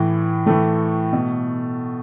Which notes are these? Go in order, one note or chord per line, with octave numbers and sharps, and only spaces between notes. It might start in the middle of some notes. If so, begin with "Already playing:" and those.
Already playing: A2 E3
A2 E3 A3
B2